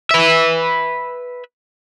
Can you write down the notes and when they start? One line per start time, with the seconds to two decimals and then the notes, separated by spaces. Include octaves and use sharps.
0.11 B4 E5